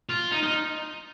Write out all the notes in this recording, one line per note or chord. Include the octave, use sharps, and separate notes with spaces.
F4
D#4
D#4